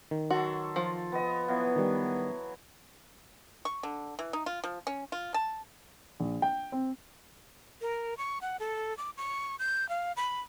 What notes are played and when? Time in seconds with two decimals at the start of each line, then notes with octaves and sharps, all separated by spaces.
0.11 D#3
0.30 F#3 F#4 A4 C6
0.76 F3 F4
1.12 B3 D#5
1.48 E3 F#3 B3 F5
1.76 D#3 G3
3.65 C#6
3.83 D3
4.19 E3
4.33 D#4
4.46 F4
4.64 F3
4.87 C#4
5.12 F4
5.34 A5
6.20 A#1
6.42 G5
6.72 C4
7.81 A#4
8.18 C#6
8.42 F#5
8.60 A4
8.97 D6
9.17 C#6
9.59 G6
9.89 F5
10.16 B5